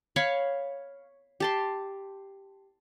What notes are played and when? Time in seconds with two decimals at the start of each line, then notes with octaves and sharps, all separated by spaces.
0.16 C#5 F5 B5 C#6
1.40 G4 A5 C6